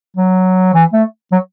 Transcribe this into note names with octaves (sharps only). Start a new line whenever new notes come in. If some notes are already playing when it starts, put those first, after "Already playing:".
F#3
E3
A3
F#3